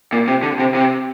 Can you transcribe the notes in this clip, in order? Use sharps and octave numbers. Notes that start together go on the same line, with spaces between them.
A#2
C3
D3
C3
C3